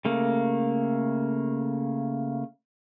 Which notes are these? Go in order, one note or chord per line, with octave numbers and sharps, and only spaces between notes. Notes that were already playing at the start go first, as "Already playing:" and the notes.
C#3 A3 A#3